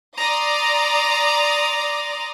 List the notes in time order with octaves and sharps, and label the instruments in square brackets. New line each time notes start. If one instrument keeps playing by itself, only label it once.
[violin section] D5 A#5 C6 D6 D#6